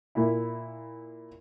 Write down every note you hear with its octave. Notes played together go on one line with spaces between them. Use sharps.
A#2 E4